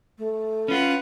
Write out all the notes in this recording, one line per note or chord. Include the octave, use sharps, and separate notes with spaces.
A3
C#4 F4 B4 F#5